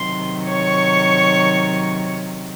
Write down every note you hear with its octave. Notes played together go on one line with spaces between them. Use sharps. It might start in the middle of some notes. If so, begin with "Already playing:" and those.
Already playing: C3 D#3 F#3 C6
C#5 C#6